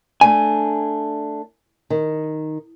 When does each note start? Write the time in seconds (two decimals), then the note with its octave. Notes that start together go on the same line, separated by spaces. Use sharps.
0.21 A3 D4 G#5
1.90 D#3